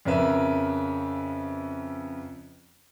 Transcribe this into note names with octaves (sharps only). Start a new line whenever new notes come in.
F2 C#3 A#4 B4 E5